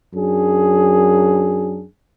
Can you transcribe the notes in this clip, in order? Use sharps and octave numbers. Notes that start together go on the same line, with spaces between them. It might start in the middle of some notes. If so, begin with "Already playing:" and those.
F#2 F#3 D4 G#4